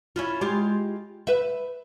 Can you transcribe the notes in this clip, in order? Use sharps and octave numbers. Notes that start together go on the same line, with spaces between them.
C#4 E4 F4
G#3 F4 G4
B4 E5